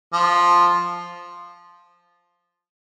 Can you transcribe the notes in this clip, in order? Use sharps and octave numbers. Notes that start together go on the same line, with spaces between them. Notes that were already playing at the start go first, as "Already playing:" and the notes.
F3